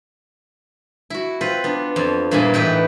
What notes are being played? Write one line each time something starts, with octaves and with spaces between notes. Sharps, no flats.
E4 F#4
C4 F4 B4
B3 D4
F2
G2 A#2 A#3 B3 E4 G#5
E2 A2 D#4 E4 B4 G5